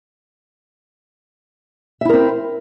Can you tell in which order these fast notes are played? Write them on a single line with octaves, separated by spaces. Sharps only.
E5 E4 A#4 C4